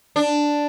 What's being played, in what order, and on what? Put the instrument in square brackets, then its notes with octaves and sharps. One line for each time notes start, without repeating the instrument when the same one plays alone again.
[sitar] D4